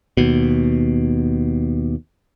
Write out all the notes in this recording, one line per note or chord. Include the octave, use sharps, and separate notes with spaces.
D#2 B2